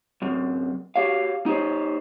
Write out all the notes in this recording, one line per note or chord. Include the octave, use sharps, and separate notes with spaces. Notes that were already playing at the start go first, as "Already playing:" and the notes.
F#2 C3
F#4 G4 C#5 F5
D#4 G4 C5 C#5